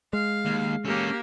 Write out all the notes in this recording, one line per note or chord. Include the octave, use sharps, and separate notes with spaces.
G#3 F5
D#2
A#3 C#4 G4 A4